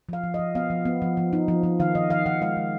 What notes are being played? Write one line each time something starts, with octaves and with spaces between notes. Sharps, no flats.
F3 F5
F3
D#5
F3
B3 F5
F3
B3
F3
F3
D#4
F3
F3
D#3 F5
D#3 D#5
D#3 F5
D#3 F#5
G#3 F5
G#3